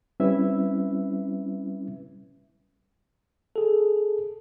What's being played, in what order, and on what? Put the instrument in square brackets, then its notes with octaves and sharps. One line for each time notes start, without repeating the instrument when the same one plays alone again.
[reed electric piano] G3 C4 C#4 E4 B4 E5
[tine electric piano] G#4 A4